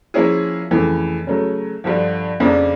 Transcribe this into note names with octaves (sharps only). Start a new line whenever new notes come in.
F3 A#3 C#4 E4 G#4
F2 C#3 E3 A3
C#3 F#3 A3
G2 D3 F3
F2 C#3 F3 A#3 D4